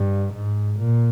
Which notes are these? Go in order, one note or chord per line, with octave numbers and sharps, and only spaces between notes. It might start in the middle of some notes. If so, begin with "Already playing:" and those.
Already playing: G2
G#2
A#2